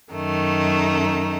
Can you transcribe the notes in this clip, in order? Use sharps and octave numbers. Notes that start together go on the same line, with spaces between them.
F#2 D#3 A3 D#4